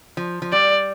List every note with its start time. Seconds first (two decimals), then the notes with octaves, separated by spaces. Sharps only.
0.17 F3
0.42 F3
0.52 G3 D5